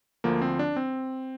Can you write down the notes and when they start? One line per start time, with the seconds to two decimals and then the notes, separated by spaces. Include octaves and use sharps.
0.24 D2 D3 F3 A#3
0.42 C4
0.59 D4
0.76 C4